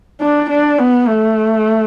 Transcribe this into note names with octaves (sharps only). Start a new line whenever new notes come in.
D4
D4
B3
A3